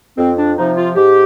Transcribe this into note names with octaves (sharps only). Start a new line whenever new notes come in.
F2 C4
D4
C3 F3 D#4
F4
G#2 G4